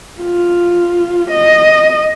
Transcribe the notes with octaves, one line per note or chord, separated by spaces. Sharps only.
F4
D#5